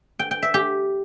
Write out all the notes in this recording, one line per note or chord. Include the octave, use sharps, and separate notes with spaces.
G5
G5
E5
G4